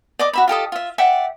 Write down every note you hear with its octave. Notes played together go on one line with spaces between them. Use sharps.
D5 D#5 D6
F#4 E5 B5
F4 G4 A4 D#5
F4 E5
D5 E5 F#5 G5